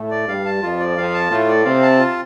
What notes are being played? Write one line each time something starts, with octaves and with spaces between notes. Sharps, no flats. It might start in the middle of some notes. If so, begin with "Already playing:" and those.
Already playing: A2 A3
D5
G2 G3 F5
A5
F2 F3 F4
D5
F2 F3 F5
A5
A2 A3 F4
D5
C3 C4 F5
A5
F4